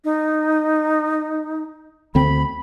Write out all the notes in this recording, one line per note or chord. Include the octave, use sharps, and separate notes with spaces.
D#4
D2 D3 C4 B5